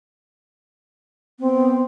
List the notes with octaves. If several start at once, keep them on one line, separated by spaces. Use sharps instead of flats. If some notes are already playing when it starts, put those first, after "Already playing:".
B3 C4